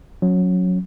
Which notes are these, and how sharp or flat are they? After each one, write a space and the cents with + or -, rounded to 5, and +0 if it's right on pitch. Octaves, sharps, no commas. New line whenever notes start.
F#3 -20 C#4 -10